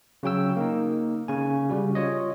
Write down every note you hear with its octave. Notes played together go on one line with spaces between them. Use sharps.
C#3 F#3 G5 E6
A#3 D#4
C#3 G#5
C#3 G3 F#4
F4 C#5 D#5